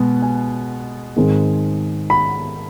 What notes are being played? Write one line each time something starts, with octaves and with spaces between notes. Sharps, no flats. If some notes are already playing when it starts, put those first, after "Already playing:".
Already playing: B2 G#3 B3
G#5
G#2 D#3 G#3 C4
B5